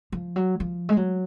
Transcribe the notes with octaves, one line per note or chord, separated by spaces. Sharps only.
F3
F#3
F3
G#3
F#3